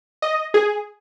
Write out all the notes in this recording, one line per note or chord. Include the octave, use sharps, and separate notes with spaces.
D#5
G#4